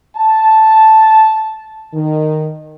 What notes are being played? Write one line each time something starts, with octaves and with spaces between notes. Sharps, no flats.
A5
D#3